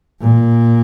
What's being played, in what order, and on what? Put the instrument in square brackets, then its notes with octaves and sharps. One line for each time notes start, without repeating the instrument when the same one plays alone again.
[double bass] A#2